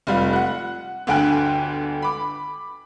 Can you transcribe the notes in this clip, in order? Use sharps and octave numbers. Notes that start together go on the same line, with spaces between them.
F1 G3 F4
F#5 F#6
G1 D2 D3 G5 G#5 F#6
B5 D6